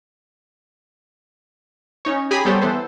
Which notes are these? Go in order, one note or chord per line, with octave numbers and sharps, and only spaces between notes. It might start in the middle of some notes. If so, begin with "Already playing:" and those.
C#4 D#4 C#5
G4 G#4 G#5 A#5 B5 D#6
G3 B3 G4 A4 C5 C#5
E3 B3 A4 C5